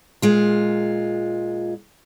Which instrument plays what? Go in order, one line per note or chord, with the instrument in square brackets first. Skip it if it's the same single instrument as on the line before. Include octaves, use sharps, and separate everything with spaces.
[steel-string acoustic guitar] A#2 G#3 F4